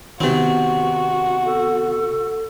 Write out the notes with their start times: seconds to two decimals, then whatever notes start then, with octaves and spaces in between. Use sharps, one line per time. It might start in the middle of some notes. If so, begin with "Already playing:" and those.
0.20 C3 D#3 B3 C4 F#4
1.45 A4